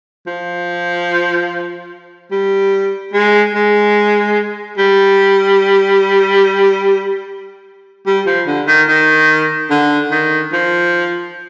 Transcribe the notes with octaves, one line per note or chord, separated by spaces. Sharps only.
F3
G3
G#3
G#3
G3
G3
F3
D3
D#3
D#3
D3
D#3
F3